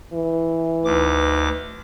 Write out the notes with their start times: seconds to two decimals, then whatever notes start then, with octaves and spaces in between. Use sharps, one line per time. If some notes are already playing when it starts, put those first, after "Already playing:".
0.13 E3
0.85 D2 D#4 B4 D6